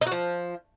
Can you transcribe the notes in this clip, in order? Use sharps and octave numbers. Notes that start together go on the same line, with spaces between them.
D#4
F#4
F3